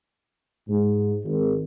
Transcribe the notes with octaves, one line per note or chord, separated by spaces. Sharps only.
G#2
G#1